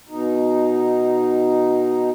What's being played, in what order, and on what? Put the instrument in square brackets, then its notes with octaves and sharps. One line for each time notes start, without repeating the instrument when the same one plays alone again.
[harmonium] B2 D#4